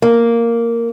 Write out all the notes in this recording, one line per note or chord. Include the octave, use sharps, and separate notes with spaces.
A#3